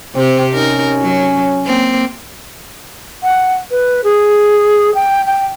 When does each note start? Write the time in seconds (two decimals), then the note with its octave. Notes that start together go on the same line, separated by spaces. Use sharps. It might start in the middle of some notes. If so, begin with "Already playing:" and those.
0.15 C3 C4 G4
0.54 C#4 D#4 A#4
1.01 F#3
1.66 A#3 C4
3.23 F#5
3.71 B4
4.04 G#4
4.95 G5
5.26 G5